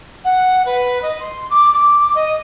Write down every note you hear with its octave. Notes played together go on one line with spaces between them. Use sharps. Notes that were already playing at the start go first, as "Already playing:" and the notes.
F#5
B4
D#5
C6
D6
D6
D#5